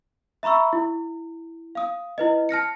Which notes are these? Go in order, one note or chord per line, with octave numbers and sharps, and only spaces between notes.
E5 A#5 B5 C#6 E6
E4
F5 D#6
E4 B4 D#5
A5 F6 A#6 C#7